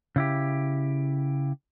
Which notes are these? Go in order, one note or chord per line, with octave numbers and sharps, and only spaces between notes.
C#3 E4 G4